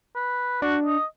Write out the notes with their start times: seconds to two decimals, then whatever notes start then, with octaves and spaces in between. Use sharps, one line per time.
0.15 B4
0.62 D4 F#4
0.85 D#5